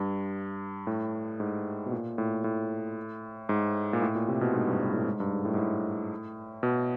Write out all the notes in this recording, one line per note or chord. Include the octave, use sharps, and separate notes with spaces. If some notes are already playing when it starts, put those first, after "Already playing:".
Already playing: G2
A2
G#2
B2
A#2
A2
A2
G#2
A#2
A2
A#2
C3
B2
G#2
G2
G#2
A2
G#2
G2
G#2
A2
G#2
A2
B2